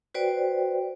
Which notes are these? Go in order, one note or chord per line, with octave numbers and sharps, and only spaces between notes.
F#4 B4 C5 D5 G5